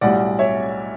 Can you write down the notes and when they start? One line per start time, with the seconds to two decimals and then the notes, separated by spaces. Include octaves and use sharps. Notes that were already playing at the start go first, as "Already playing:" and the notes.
0.01 B1 A2 G3 D5 F#5
0.39 C#5 E5